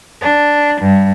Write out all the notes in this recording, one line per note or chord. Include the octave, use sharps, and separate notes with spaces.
D4
G2